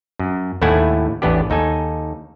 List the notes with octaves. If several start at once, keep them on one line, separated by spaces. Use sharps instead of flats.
F#2
D#2 A2 A3 E4 F#5 G#5
A1 E2 B3 D4 G4
D#2 D#4 A4 G#5